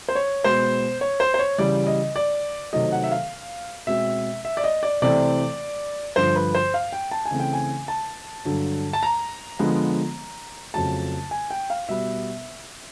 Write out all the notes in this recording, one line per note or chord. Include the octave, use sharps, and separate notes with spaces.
C5
C#5
B2 G#3 B3 C5
C#5
C5
C5
C#5
C#3 E3 G3 D5
D#5
D5
C3 D#3 F#3 A3 D#5
F#5
E5
F5
B2 G#3 C4 E5
E5
D5
D#5
D5
C3 E3 A3 C4 D5
G2 D3 F3 C5
B4
C5
F5
G5
A5
G#5
C#3 E3 A3 C4
G5
G#5
A5
G2 D3 F#3
A5
A#5
D3 F3 G#3 B3
F2 C#3 F#3 A3 A5
G#5
G5
F5
B2 G3 B3 E5